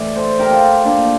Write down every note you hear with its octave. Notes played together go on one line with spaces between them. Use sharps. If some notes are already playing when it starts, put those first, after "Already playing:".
Already playing: A2 E3 D5 E5
A4 C5
G4 A#4
F4 A4
A#3 D4